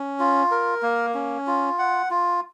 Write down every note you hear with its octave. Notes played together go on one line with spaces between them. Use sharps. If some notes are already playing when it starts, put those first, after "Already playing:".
Already playing: C#4
F4
A#4
A#3
C#4
F4
F#5
F4